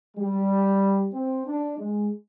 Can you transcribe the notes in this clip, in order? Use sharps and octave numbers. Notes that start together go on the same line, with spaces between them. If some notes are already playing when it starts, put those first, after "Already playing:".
G3
C4
D4
G#3